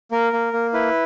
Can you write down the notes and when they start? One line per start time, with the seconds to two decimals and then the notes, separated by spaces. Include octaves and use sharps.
0.11 A#3 A#4
0.33 A#3
0.53 A#3
0.73 E4 B4